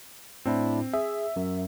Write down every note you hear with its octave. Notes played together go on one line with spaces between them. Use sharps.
A2 C4 D4 E4
G#4 E5
F#2